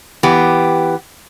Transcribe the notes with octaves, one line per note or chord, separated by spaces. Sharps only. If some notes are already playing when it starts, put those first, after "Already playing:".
E3 B3 G4